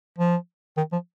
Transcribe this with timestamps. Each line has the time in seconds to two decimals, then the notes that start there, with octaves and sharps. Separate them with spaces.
0.18 F3
0.77 D#3
0.93 F3